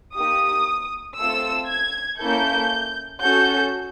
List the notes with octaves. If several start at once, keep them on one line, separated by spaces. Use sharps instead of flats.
A#3 D#4 G4 D#6
A3 C4 F4 A4 E6
G#6
A#3 C#4 E4 A4 G6
C#4 F#4 A4 G6